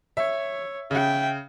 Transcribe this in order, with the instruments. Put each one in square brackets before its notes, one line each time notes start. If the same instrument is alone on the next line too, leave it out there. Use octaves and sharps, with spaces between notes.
[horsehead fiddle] C#5 [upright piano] E5
[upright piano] C#3 [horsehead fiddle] E5 G5